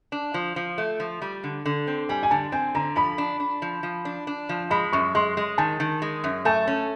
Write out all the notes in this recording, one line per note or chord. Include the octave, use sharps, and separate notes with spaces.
D4
F3
F3
A3
F3
G3
D3
D3
C4
G3 G#5
G#5
D3 A5
C4 G#5
D3 A#5
F3 B5
D4
D4
F3
F3
D4
D4
F3
G#3 B5
F#2 C#6
G#3 C6
G#3
D#3 A5
D#3
G#3
F#2
A3 A5
C#4